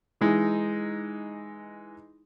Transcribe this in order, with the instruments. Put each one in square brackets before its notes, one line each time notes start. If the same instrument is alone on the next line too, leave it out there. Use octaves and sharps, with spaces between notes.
[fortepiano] E3 G#3 D#4